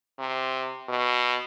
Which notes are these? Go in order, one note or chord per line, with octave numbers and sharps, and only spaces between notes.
C3
B2